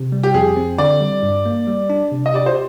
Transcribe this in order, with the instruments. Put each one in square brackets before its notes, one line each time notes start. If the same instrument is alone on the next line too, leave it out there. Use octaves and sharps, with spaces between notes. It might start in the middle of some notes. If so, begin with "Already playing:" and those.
Already playing: [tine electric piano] C3
G3
[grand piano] G4
[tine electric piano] F2 [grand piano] G#4
[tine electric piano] C4
[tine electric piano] D3 [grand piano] D5
[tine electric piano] G3
G2
A#3
G3
D4
C3
[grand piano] D#5
[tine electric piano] G4 [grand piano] D5
[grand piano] C5